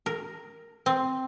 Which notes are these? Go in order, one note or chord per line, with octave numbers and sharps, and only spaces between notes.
A#4
C4